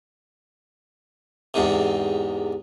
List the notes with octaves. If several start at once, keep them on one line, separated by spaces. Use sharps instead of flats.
E2 G#2 C3